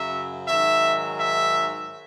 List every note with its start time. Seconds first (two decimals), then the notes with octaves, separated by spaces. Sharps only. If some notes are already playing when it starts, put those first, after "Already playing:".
Already playing: F#2 C#3 F#3 E5
0.48 G#2 D#3 F#3 E5
1.19 E5